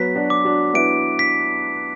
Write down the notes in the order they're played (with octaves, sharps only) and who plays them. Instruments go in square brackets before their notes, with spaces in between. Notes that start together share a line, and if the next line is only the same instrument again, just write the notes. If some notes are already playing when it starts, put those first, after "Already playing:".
Already playing: [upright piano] F#3 B3 [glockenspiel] B6
[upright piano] D4 F#4
[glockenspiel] D6
[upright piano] D4 F#4
[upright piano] B3 E4 [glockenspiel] D7
[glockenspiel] B6